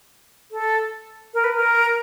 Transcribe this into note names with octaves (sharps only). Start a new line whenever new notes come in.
A4
A#4
B4
A#4